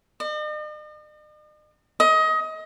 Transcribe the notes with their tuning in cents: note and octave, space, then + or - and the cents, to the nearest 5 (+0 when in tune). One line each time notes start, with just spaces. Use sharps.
D#5 -45
D#5 +25